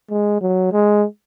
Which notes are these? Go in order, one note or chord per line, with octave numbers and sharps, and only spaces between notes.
G#3
F#3
G#3